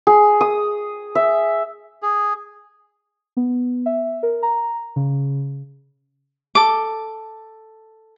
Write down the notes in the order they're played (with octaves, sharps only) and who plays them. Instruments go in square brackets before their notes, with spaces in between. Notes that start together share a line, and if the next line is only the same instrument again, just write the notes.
[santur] G#4
D#6
E5
[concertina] G#4
[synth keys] B3
E5
A#4
A#5
C#3
[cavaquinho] A4 D6